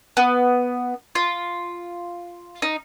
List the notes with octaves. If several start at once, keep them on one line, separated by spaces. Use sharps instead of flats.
B3
F4
D#4